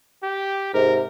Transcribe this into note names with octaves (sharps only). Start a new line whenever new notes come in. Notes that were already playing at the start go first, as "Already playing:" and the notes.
G4
G#2 C3 A#4